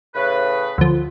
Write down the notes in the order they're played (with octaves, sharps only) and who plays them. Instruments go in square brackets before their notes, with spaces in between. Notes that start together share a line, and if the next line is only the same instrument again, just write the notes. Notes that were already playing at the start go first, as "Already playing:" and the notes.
[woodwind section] A2 C#3 B4
[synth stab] D2 F3